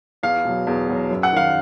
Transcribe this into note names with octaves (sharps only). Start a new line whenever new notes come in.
E2 F5
B2 F#3
E2
B2 F#3
F#2
F#5
D#3 F#3 F5